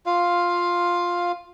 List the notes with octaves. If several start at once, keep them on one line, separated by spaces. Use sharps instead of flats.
F4 F5